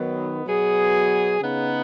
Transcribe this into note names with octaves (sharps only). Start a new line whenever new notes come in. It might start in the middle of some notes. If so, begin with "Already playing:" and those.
Already playing: D#3 F#3 B3
B2 F#3 B3 G#4
C#3 B3 D#4